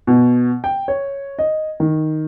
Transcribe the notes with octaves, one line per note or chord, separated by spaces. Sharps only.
B2
G5
C#5
D#5
D#3